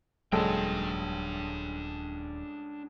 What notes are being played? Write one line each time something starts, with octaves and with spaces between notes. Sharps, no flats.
D#1 C#2 F#3 G#3 A#3 D4 A4 G5